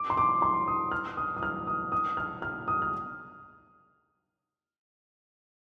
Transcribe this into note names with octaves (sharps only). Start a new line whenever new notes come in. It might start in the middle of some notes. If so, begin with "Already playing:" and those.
Already playing: D6
C6
D6
C6
D#6
F6
D#6
D#6
F6
D#6
D#6
F6
F6
D#6
F6